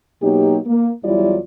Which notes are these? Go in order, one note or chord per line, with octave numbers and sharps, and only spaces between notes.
B2 F#3 A#3 D#4 G4
A#3
E2 F#3 G3 E4 F4 D5